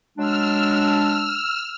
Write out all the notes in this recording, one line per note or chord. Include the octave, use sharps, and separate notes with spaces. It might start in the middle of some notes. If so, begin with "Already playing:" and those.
F#3 G#3 D4 E6 F6